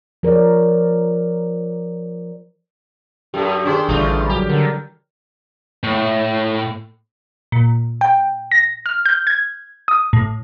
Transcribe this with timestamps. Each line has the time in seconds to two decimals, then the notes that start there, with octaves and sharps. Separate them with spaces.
0.23 F3 A#4 C#5 D5
3.34 F#2 G4 A4
3.65 D#3 C#4 D4 G4 G#4 C5
3.89 A1 D3 E3 G3 A3 D4 F4
4.29 F#3 G3 G4
4.49 D3 A#4
5.83 A2
7.52 A#2
8.01 G5
8.52 A#6
8.86 F6
9.06 G6
9.27 G#6
9.88 D#6
10.13 A2